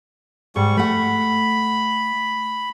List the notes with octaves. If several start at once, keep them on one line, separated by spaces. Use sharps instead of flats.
G#2 G3 C#6
A3 F#5 B5